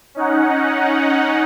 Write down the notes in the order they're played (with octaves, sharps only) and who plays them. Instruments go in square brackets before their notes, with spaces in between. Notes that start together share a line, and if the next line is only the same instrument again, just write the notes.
[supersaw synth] C#4 D#4 F#5